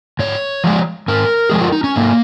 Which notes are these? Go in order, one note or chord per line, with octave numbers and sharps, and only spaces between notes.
G#2 C#5
F3 G#3
G#2 A#4
F3 G#3 G#4
F4
D#4
C#4
G#2 A#3